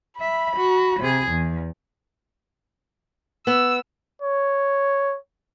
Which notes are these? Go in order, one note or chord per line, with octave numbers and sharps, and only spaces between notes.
E5 B5
F#4
C3 G#4
E2
B3 E6
C#5